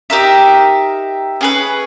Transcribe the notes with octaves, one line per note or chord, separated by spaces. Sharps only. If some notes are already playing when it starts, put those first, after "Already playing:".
D#4 G4 A#4 E5
C#4 G#4 B4